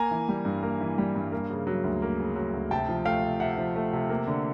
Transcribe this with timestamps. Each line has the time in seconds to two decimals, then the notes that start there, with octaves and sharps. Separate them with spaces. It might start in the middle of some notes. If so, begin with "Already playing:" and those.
Already playing: A#3 G#5 A#5
0.11 E3
0.29 G3
0.45 G2
0.63 A#3
0.81 E3
0.98 G3
1.15 G2
1.32 A#3
1.50 C#3
1.67 F#3
1.84 D2
2.02 A#3
2.20 C#3
2.36 F#3
2.54 D2
2.71 C3 G5 A5
2.88 F3
3.05 A3 F5 G5
3.23 C3
3.40 C3 E5 F#5
3.58 F3
3.76 A3
3.93 C3
4.09 A#3
4.27 D3